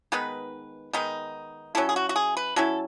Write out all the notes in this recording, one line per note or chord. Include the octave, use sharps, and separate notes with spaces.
D#3 G#3 B3 D#4 B4
D#3 G#3 B3 D#4
F#3 C#4 E4 A4
G#4
F#4
F#4
G#4
B4
F#3 C#4 E4 A4